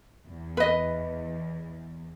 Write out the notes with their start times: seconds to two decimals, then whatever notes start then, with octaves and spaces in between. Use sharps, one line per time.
0.25 E2
0.57 B4 D#5